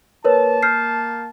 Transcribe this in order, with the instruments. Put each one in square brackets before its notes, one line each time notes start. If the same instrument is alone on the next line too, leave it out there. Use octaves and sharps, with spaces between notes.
[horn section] A#3 A5 [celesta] A#4 B4 C#5
[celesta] F6 G6 C7